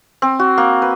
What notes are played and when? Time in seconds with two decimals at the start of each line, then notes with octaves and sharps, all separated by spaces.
0.22 C4
0.39 F#4
0.58 A#3
0.82 B4